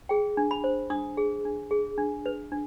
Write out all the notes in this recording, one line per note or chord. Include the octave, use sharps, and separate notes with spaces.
G#4 G5
D4
B5
C5
D4 D#6
G#4
D4
G#4
D4
B4
D4